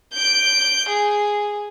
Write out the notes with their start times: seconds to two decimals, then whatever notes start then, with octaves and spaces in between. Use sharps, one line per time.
0.13 G6 D7
0.89 G#4